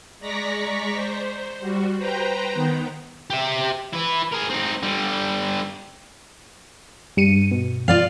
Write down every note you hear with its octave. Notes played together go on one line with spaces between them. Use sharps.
G#3 D5 A#5 C#6 A#6 B6
C5
G3 F#4
B4 C5 G5 A#5
D#3 B3
G4 E5
E4 B4
G#4 A#4
C4 D#4
D3 G3
G2 C#7 D#7
B2
F4 D5 F5